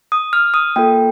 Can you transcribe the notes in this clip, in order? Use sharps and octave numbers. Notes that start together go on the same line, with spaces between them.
D#6
F6
D#6
A#3 F4 A4 G5